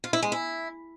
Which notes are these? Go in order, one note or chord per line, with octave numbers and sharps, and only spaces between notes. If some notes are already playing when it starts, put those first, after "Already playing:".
F4
E4
G#3
E4